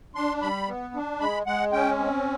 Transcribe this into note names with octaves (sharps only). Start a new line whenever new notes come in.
D4 C6
G3 B5
B3
D4
G#3 B5
G#3 F#5
C#4 G5
C4